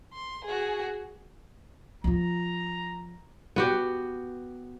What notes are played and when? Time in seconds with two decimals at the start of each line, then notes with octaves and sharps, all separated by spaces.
0.13 C6
0.45 F#4 G#4
2.04 F3 F4 A#5
3.56 B3 F#4 G4